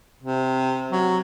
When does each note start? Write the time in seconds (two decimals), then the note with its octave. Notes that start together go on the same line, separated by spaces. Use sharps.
0.23 C3
0.91 F#3